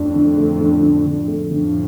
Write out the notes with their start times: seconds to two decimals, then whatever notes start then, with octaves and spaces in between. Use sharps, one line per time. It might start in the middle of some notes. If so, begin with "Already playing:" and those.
Already playing: F2 A2 D4
0.15 D3
0.37 A3
0.61 D3
0.83 D4
1.06 D3
1.28 A3
1.51 F2 A2 D3